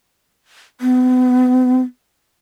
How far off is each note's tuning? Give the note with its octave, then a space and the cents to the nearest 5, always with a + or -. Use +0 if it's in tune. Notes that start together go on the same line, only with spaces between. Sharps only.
B3 +40